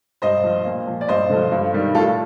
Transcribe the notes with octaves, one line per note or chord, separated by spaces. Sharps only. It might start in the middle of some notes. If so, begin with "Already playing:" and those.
G2 C5 D#5
F3
A#2
F3
D5
G2 C5 D#5
D3 F3
G2
D#3 G3
A2 F4 A4